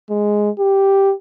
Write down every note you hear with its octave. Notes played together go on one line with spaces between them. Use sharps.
G#3
G4